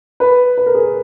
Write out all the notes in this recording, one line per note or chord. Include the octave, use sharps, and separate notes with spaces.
B4
B4
A#4
G#4
A#4